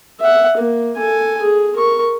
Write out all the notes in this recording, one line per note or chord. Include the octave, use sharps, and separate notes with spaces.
E5 F#5
A#3
A4 G#5
G#4
A#4 C#6